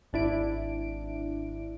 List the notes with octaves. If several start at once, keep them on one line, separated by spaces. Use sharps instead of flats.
G#1 D4 E4 D7